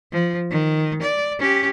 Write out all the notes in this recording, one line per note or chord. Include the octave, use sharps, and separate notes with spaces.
F3
D#3
D5
C#4 G4